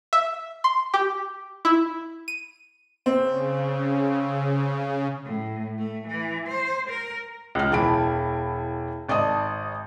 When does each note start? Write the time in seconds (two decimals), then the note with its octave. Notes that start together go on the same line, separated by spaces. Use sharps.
0.13 E5
0.64 C6
0.94 G4
1.65 E4
2.28 D#7
3.06 C#3 C4
5.25 A2
5.78 A3
6.07 E3
6.48 C5
6.89 A#4
7.55 C#2 F6
7.71 E1 E3 A5 B5 D7
9.09 G#1 D5 D#5 A5 D#6